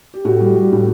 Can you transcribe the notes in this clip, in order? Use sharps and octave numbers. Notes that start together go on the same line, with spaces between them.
G4
A2 F#4
G3
G3
A2